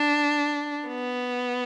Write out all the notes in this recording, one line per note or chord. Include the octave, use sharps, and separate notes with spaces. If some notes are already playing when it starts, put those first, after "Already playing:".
Already playing: D4
B3